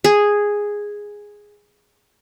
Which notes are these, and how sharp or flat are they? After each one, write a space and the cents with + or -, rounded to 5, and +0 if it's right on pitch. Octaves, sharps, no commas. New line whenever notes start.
G#4 -5